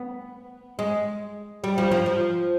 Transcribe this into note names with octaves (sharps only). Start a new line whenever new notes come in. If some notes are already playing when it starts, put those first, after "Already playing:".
Already playing: B3
G#3
G3
F3
F3
F3